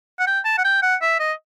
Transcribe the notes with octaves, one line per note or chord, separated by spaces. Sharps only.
F#5
G5
A5
F#5
G5
F#5
E5
D#5